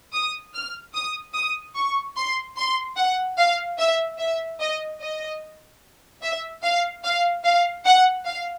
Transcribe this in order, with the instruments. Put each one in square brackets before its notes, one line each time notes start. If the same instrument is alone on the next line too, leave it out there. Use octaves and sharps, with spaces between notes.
[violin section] D#6
F6
D#6
D#6
C#6
C6
C6
F#5
F5
E5
E5
D#5
D#5
E5
F5
F5
F5
F#5
F5